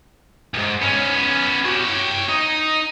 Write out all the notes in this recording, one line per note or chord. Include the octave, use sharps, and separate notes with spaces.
C#2 G#2
B3 C#4
F#4 G4
C#5 G5
D#4